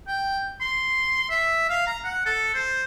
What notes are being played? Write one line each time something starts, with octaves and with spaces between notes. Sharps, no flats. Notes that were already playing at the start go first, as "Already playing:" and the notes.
G5
C6
E5
F5
A#5
F#5
A4
C5